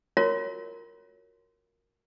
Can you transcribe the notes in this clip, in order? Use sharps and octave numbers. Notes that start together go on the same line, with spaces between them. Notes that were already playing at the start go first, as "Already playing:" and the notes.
F4 F#4 A#4 C#5